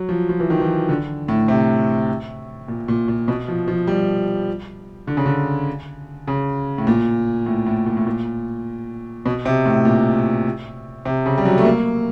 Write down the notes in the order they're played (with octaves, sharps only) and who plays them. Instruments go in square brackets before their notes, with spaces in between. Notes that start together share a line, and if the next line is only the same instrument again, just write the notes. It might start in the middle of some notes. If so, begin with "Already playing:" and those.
Already playing: [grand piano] F#3
F3
F3
E3
D#3
E3
D3
A2
C3
A#2
A#2
A#2
B2
F3
F3
G3
D3
C#3
D3
C#3
A2
A#2
A2
A2
A#2
A2
A#2
B2
C3
A2
A#2
C3
C#3
G3
F#3
A3
A#3